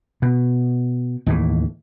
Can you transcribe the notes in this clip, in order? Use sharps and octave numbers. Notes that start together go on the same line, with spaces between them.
B2
D#2 A2 E3